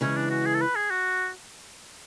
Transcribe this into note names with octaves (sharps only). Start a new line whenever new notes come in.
C#3 E3 G#3 C#4
D4
F#4
G#4
A4
B4
G#4
F#4